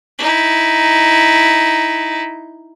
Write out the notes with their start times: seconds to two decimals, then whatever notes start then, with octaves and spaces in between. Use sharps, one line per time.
0.18 D#4 E4